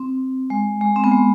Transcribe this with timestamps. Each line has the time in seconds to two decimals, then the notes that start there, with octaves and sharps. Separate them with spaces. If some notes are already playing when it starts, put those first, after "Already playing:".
Already playing: C4
0.50 G#3
0.81 G#3
0.96 C4
1.04 B3
1.11 G#3